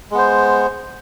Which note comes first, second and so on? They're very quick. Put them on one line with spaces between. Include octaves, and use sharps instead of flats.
G#3 B3 C5